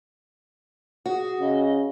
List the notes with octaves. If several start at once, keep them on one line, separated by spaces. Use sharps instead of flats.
F#4 G#4
C#3 D#5